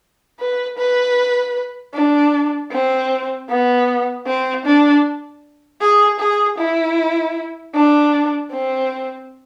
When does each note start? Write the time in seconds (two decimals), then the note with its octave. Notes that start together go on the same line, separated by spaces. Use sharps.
0.40 B4
0.78 B4
1.94 D4
2.72 C4
3.49 B3
4.27 C4
4.66 D4
5.81 G#4
6.20 G#4
6.59 E4
7.75 D4
8.51 C4